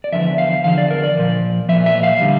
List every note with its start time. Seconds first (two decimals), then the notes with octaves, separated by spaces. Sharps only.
0.04 D5
0.12 E2 D3 F3 E5
0.38 F5
0.64 E2 D3 F3 F5
0.78 D5
0.90 A#4
1.04 D5
1.17 A#2 F3
1.69 A#2 F3 E5
1.86 E5
2.03 F5
2.21 D3 G3